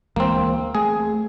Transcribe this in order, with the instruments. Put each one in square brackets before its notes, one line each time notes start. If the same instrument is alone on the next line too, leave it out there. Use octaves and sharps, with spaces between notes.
[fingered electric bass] D2 E3 G#3 [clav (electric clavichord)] A#3 C4
[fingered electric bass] A3 [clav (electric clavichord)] G#4